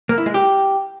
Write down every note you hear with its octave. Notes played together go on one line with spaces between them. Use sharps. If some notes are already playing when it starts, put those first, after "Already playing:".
A#3
E4
G#3
G4